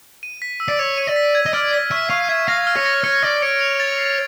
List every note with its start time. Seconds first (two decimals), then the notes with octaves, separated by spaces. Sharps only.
0.23 D#7
0.42 B6
0.60 E6
0.68 D5
0.79 C#5 E6
0.98 D#7
1.07 D5
1.16 B6
1.35 G#6
1.46 D#5
1.53 D5 F6
1.73 B6
1.91 E5 C#6
2.10 F5 C#6
2.29 E5 G#6
2.48 F5 A#6
2.67 F6
2.76 C#5
2.86 A#6
3.04 C#5 F6
3.23 D5 F6
3.42 C#5 D7
3.61 F7
3.80 A6
3.98 C7